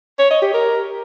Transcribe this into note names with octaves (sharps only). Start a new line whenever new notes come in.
C#5
D#5
G4
A#4